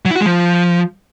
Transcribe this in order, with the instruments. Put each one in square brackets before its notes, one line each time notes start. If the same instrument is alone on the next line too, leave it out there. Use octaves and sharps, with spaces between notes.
[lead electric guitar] F#3
E4
F#4
G#3
F3